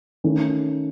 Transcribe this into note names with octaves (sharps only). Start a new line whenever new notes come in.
D#3 A3 C#4